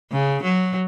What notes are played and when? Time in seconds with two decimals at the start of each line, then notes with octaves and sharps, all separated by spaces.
0.12 C#3
0.43 F#3